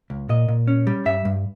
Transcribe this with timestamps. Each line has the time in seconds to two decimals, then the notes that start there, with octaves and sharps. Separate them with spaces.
0.10 C#2
0.29 A#2 D#5
0.48 A#2
0.67 C#4
0.87 G3
1.06 G2 E5
1.25 G2